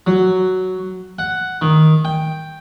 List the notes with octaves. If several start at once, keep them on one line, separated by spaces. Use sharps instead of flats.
F#3
F#5
D#3
G5